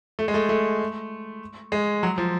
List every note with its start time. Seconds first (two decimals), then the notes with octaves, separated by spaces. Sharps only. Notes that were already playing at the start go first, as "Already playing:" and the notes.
0.19 A3
0.28 G#3
0.34 A3
0.49 A3
1.72 G#3
2.03 F#3
2.18 F3